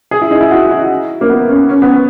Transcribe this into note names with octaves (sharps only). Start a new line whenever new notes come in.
G#4
E4
D#4
E4
F#4
E4
A#3
B3
C#4
C#4
B3